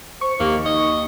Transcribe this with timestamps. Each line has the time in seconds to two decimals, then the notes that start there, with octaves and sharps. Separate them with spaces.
0.21 C5 C#6
0.40 D#2 A#3 G4
0.66 D#4 D#5